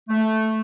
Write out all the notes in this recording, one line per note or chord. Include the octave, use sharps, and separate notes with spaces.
A3